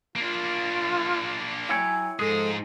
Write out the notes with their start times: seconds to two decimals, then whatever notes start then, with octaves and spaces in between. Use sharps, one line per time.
0.16 A#3 D4 F4
1.69 F#3 E4 C#5 G5 G#5
2.19 G#2 F3 G#3 G#4 A4